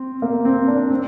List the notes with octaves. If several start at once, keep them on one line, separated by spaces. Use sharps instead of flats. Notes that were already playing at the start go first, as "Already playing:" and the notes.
Already playing: C4
A#3
C4
D4
C4